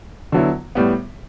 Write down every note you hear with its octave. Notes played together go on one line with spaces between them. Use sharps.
D3 F#3 B3 E4
A2 G3 B3